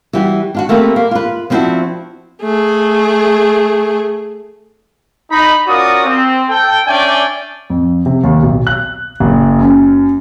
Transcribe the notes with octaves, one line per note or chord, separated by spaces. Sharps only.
E3 G3 F#4
D4 F4 F#4
A3 A#3 C4 G4 B4
A#3
F4 B4
F3 B3 C4 D4 E4 F#4
A3 G#4
D#4 B5
C#4 F4 F#4 A#4 D5 D#6
C4
A4 G5
C#4 D4 D5 E5 G5 G#5
F2
C3
D#2
B1
F#6
F#1
F#2